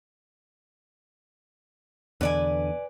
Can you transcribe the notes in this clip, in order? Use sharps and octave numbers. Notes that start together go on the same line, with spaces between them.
E2 B2 D3 B4 D5 G#5